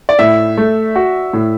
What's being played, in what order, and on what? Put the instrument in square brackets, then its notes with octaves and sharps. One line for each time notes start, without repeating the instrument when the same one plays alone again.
[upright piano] D5
[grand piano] A2 [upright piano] E5
[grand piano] A3
F#4
A2